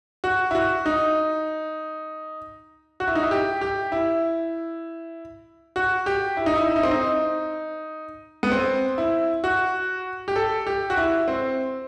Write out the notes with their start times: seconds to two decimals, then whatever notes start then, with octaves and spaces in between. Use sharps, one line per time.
0.24 F#4
0.51 E4
0.55 F#4
0.86 D#4
3.00 F#4
3.07 E4
3.15 D#4
3.23 E4
3.31 G4
3.61 G4
3.92 E4
5.76 F#4
6.06 G4
6.37 E4
6.46 D#4
6.56 E4
6.68 E4
6.76 D#4
6.83 C4
6.91 D#4
8.43 B3
8.52 C4
8.98 E4
9.44 F#4
10.28 G4
10.36 A4
10.67 G4
10.90 F#4
10.97 E4
11.28 C4